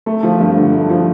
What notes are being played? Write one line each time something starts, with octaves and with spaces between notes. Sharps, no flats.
A3
F3
G2
D3
A3
F3